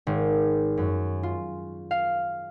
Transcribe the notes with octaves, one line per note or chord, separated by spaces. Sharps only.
G#1
F#2
F4
F5